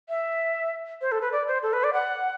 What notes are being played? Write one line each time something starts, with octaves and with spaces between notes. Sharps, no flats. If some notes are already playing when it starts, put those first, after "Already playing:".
E5
C5
A4
B4
D5
C5
A4
B4
D5
F#5